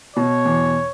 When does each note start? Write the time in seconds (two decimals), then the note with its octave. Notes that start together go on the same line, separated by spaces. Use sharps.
0.17 B2 C#5
0.45 E2